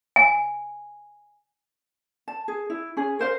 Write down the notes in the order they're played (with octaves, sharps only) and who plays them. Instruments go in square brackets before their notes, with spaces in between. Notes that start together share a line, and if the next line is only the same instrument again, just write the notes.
[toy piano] G#5
[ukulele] A5
G#4
E4
C#4 G#4
A#4 C5 F5